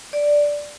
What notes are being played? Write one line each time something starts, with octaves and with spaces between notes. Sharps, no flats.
D5